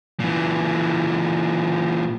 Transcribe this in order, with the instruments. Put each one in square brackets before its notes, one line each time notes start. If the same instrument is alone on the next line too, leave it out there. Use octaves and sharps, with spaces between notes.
[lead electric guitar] A#2 E3